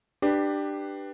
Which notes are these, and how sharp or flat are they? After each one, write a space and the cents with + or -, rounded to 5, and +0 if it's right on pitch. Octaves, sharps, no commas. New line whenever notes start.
D4 +20 G4 +0 B4 +0